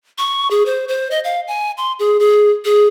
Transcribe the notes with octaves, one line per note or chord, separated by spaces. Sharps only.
C#6
G#4
C5
C5
D#5
F5
G#5
C6
G#4
G#4
G#4